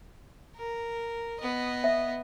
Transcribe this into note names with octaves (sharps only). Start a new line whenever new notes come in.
A#4
B3 D#5
E5